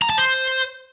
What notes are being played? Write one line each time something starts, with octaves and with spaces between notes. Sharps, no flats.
A#5
A5
C5